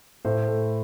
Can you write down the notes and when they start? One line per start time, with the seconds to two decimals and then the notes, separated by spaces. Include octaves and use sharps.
0.25 A2 C5
0.48 A3